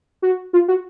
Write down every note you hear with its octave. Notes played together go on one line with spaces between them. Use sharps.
F#4
F4
F#4